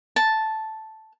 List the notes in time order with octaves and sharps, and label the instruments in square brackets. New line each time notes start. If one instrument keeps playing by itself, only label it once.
[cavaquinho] A5